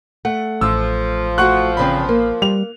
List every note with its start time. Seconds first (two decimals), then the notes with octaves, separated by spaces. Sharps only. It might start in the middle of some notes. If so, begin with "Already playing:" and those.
0.25 A3 F#5
0.61 A1 F3 E6
1.38 A3 F#4 F#5 C#6 F#6
1.77 E2 C#3 C4 B5
2.09 A#3
2.42 G3 F7